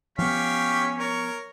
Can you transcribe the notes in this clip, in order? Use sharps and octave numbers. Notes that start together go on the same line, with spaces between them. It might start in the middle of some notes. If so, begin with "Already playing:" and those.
F3 B3 C#4 G4 F5 C#6 B6
A#4 C#5